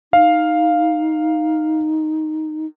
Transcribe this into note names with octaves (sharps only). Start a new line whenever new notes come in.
D#4 F5